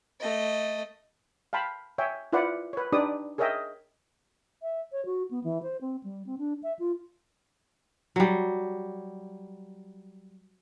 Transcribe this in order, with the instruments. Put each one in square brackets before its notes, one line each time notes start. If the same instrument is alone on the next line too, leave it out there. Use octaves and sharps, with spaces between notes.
[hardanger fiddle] A3 D#5
[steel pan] F5 G5 A5 B5 C6
C#5 E5 G5 G#5
E4 F4 B4 C5 D5 F#5
B4 C#5
D4 D#4 G4 B4 D5 D#6
G#4 A#4 C#5 D#5 E5 G5
[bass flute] E5
C#5
F#4
B3
E3
C5
C4
G3
C4
D4
E5
F4
[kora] F#3 G3